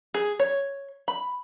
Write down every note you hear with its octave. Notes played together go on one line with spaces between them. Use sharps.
G#4
C#5
B5